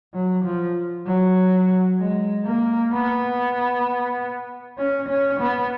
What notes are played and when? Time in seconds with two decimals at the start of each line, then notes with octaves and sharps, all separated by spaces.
0.14 F#3
0.45 F3
1.07 F#3
2.00 G#3
2.46 A#3
2.93 B3
4.78 C#4
5.09 C#4
5.40 B3